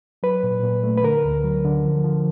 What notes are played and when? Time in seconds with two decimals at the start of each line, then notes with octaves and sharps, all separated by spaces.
0.23 F#3 B4
0.43 A#2
0.63 A#2
0.84 A3
0.98 B4
1.03 D3 A#4
1.25 D2
1.44 F#3
1.65 D3
1.85 F3
2.05 F3